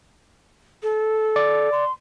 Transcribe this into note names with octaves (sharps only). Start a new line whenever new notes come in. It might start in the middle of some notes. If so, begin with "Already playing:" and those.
A4
D5
C6